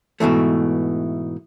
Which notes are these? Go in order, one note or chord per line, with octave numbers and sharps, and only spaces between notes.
G#2 B2 D#3 E3 A3